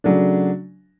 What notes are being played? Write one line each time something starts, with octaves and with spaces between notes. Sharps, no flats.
C#3 F#3 A3 D4